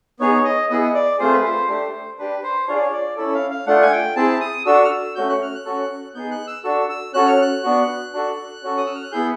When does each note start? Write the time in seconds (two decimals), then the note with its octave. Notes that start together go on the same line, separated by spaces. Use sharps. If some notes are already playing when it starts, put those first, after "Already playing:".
0.19 B3 D#4 G#4 C#5
0.44 D#5
0.70 B3 E4 G#4 D#5
0.94 D5
1.19 A3 C4 F4 G#4 C5
1.32 B4
1.44 C5
1.68 A3 D4 G4
2.18 D4 G4 B4
2.43 C5
2.68 D4 F4 G#4 C#5
2.75 D5
2.82 C#5
2.92 D5
3.17 C#4 E4 A4
3.34 F5
3.50 F5
3.66 A3 D4 F4 F#5
3.82 G#5
3.92 G5
4.16 C4 E4 G#4 A5
4.41 D#6
4.66 D4 F#4 A4 E6
4.84 F6
4.91 E6
5.15 A3 C#4 F#4 G6
5.29 F#6
5.42 F6
5.55 F#6
5.65 C#4 F#4 A4
6.15 B3 D#4 G#4 G6
6.31 F#6
6.47 E6
6.64 D4 F#4 A4 E6
6.89 E6
7.14 C#4 F#4 A4 F#6
7.27 F6
7.42 F#6
7.63 B3 D4 F#4
8.13 D4 F#4 A4
8.63 C#4 F#4 A4
8.78 D#6
8.86 E6
8.95 F6
9.03 F#6
9.12 B3 E4 G#4 G6